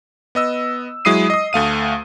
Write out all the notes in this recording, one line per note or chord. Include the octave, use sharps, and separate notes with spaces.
B3 D#5 E6
F#3 G#3 E4 D#6 C7 D#7
D#5 D#6
D2 A3 F5 D#7